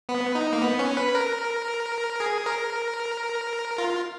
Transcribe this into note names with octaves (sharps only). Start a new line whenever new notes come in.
B3
D#4
A#3
B3
C#4
B4
A#4
G#4
A#4
F4